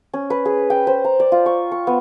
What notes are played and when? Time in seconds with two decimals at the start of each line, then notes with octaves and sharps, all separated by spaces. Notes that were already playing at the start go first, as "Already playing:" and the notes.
0.13 C#4
0.30 B4
0.45 G#4
0.70 G5
0.87 C5
1.04 A#5
1.20 D5
1.32 F4
1.46 C#6
1.72 C#6
1.87 B3